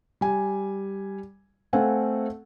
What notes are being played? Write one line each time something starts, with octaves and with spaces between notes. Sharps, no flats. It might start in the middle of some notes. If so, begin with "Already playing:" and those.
G3 G#5
A3 C4 A4 F5 F#5 G#5